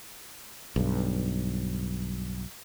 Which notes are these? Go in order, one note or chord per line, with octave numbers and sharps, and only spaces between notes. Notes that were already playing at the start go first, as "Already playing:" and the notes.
B1 G2